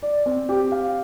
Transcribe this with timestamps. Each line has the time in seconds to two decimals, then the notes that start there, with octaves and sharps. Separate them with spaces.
0.02 D5
0.26 C4
0.49 G4
0.72 F5